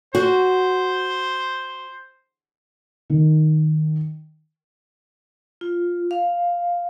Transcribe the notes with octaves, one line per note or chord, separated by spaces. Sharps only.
F#4 C5
D#3
F4
F5